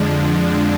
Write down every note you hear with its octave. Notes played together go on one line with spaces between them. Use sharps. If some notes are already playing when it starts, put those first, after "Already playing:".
Already playing: F2 D3 F3 G#3 D4